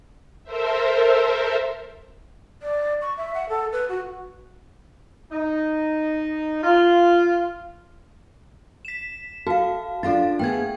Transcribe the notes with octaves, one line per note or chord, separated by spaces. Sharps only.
A4 A#4 C5 E5
D5
C#6
E5
F#5
A4
B4
F#4
D#4
F4
B6 E7
F#4 A4 F5
D4 F4 A4 F5 A6
A3 B3 G#4 G5 G#6